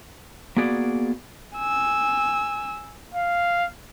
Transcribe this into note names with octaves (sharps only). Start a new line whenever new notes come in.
A#3 B3 F#4 G#4 D5
G#5 E6
F5